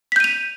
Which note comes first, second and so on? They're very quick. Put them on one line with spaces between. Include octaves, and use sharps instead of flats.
B6 G6 D#7 F7